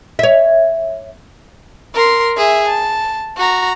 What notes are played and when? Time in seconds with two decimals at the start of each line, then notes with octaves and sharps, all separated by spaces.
0.19 C#5 E5
1.94 A#4 C6
2.37 G#4 E5
2.68 A5
3.37 F#4 A#5